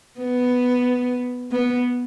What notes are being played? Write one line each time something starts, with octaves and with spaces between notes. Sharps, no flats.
B3
B3